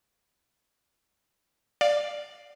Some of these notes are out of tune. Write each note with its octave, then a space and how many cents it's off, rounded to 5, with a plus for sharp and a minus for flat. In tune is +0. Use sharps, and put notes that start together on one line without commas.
D5 +0 F5 +0